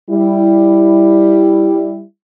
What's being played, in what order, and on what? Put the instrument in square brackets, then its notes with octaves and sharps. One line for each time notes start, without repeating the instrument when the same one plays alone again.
[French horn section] G3 E4